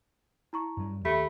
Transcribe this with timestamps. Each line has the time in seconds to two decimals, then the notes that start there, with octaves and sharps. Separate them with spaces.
0.53 E4 A#5 C#6
0.77 G2 F#3 G3
1.05 D#2 A3 G4 B5 B6